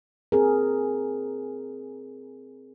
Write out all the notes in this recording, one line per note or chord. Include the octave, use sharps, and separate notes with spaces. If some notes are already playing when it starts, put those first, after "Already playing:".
C4 G#4 A#4